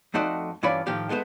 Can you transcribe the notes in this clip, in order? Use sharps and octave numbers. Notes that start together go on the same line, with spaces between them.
F2 A3 D#4 F#4 C5 D5
G2 E3 C#4 F4 D5 B5
A2 D#3 F3 G4
G#3 A3 B3 G4 C5